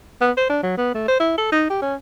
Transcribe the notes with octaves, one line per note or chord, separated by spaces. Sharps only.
B3
C5
D4
F#3
B3
A3
C5
E4
A4
D#4
G4
C#4